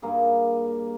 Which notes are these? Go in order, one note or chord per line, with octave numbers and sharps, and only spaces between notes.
G2 A#3 G#4